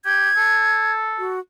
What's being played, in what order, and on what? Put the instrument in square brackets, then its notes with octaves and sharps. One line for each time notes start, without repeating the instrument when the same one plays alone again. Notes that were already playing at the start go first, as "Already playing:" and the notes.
[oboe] G4 [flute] G#6
[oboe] A4
[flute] F#4